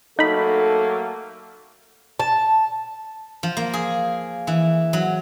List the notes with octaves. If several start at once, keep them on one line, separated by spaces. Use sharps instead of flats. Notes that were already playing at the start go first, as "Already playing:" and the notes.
F#3 A3 A#3 D#4 A4 B5
A5
F3
A#3
G#4
E3
F#3